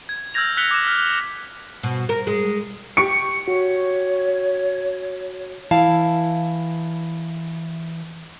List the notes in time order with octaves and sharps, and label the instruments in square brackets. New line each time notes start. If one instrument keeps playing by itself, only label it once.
[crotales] G#6
E6 F6 G6 G#6 A#6 F7
E6 F#6 B6 C#7 F7 G7
D6 B6 E7
F6 G#6
[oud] B2
A#4
G#3
[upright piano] G4 C#6 D7 [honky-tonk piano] C#7
[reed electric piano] F#4 [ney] C#5
[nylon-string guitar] E3 E4 F5 A5